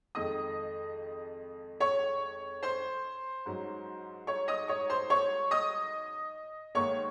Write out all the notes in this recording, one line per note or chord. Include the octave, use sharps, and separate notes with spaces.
F2 D#3 G#3 D#5 D#6
C#5 C#6
C5 C6
G#2 F#3 C#4
C#5 C#6
D#5 D#6
C#5 C#6
C5 C6
C#5 C#6
D#5 D#6
G#2 D#3 A#3 C#5 C#6